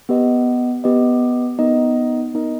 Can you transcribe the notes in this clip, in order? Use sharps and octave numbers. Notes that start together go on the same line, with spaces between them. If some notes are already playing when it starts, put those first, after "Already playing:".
B3 G4 B4 D#5
B3 G4 B4 D#5
B3 D#4 A#4 D#5
B3 D#4 A#4 D#5